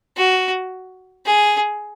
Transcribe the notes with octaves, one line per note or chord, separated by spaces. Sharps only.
F#4
G#4